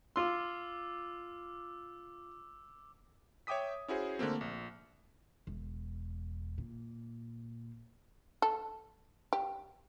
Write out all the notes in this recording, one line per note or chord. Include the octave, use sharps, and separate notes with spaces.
F4 C6 D6 E6
C#5 E5 G5 D6 D#6 B6
C#4 E4 F#4 G#4 C5
D3 A3 A#3 C4
A#1
E1
A#2
A4
G4